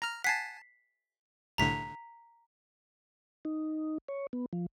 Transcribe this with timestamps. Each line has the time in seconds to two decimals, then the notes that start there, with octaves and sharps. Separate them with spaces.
0.02 A#5 F6
0.24 F#5 G#5 A5 B6 C7
1.58 C2 A2 D3 A#5 B6
3.45 D#4
4.08 C#5
4.33 B3
4.53 F3